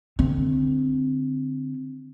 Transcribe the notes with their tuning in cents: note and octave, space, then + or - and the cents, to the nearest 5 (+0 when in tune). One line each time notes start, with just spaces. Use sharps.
D3 +5 C4 -5